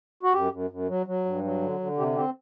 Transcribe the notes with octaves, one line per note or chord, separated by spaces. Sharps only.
F#4
F#2 G4
F#2
F#2
F#3
F#3
G2
F#3
D3
D3
C3 G4
C4 G4